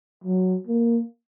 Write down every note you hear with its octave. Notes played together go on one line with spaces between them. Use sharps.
F#3
A#3